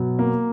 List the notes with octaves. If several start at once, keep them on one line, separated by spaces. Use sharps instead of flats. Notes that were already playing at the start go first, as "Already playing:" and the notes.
Already playing: B2 F#3
A#3